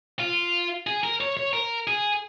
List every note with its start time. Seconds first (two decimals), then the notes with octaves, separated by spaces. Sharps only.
0.19 F4
0.87 G#4
1.03 A#4
1.21 C#5
1.37 C#5
1.53 A#4
1.87 G#4